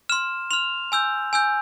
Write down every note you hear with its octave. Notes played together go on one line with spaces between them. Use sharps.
C6 F6 E7
C6 F6 F7
G#5 E6 G6
G#5 E6 G6